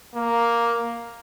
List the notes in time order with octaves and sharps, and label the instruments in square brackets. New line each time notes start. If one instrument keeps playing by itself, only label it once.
[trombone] A#3